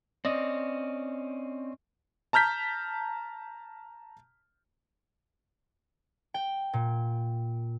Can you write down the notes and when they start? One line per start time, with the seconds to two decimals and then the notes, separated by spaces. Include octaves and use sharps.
0.25 C4 C#4 D5 D#5
2.33 A5 A#5 F6 G6 B6
6.34 G5
6.73 A#2